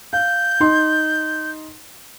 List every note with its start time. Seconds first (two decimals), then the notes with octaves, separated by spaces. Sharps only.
0.13 F5 G6
0.60 D#4 C6